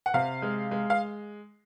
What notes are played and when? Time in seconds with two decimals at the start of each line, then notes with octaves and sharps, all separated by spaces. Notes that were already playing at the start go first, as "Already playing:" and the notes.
0.06 F#5
0.14 C3 F5
0.42 G#3
0.71 G#3
0.90 F5